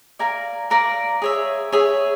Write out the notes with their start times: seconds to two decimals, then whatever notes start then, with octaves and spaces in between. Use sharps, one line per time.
0.19 A#4 D5 F5 G#5
0.70 A#4 D5 F5 G#5
1.22 G#4 C#5 E5
1.72 G#4 C#5 E5